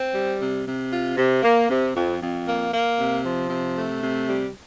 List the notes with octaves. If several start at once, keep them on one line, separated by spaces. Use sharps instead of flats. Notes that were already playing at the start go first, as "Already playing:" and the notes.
Already playing: C4
G3
C3
C3
F4
C3
A#3
C3
F2
F2
A#3
A#3
C3
F3
C3
A3
C3
G3